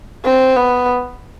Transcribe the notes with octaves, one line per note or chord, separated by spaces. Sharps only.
C4
B3